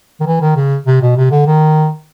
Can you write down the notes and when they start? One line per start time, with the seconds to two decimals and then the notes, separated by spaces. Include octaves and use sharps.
0.20 D#3
0.26 E3
0.41 D#3
0.56 C#3
0.87 C3
1.02 B2
1.16 C3
1.31 D3
1.47 D#3